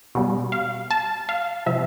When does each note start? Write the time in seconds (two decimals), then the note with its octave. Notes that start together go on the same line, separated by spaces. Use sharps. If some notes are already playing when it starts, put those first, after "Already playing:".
0.15 B2 G3 B3
0.52 F5
0.91 A5
1.29 F5
1.66 C3 F3 E5